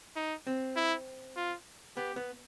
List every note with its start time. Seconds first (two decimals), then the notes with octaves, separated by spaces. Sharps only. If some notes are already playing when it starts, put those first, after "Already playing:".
0.16 D#4
0.47 C4
0.76 E4
1.36 F4
1.97 B3 G4
2.16 B3